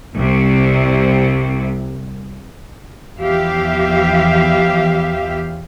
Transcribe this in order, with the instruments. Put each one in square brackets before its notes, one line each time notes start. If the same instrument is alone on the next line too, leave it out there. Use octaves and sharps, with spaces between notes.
[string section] C2 C3
[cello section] E2 F3 G4 E5 F5